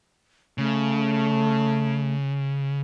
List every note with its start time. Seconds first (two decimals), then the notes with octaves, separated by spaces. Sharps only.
0.58 C#3 A3